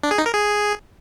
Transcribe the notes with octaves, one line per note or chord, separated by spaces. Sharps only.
D4
G#4
D#4
A#4
G#4